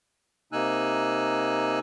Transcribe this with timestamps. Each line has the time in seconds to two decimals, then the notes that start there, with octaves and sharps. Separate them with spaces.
0.53 C3 A#3 D#4 G#5 E6 F#6